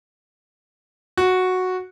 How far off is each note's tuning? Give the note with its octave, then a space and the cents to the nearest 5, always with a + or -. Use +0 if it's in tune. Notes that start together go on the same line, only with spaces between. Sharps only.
F#4 -5